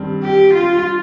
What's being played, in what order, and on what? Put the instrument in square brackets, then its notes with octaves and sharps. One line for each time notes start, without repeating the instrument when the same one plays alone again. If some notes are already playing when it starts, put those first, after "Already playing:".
Already playing: [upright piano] G2 D#3 G3 C4
[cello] G4
F4